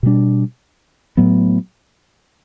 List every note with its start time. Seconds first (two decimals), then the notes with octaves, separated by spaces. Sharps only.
0.03 B2 G3 D4
1.17 A2 F#3 B3